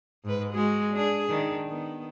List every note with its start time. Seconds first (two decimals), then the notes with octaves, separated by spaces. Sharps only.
0.24 G#2 B4
0.53 G#3 F#4 G#4
0.92 D4 G#4
1.28 D#3 D4
1.67 D#3 B3